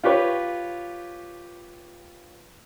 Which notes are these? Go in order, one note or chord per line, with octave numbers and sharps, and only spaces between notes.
F4 G4 B4 C#5